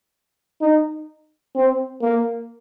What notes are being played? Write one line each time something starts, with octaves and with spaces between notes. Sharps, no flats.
D#4
C4
A#3